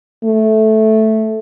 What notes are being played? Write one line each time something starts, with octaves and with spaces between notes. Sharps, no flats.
A3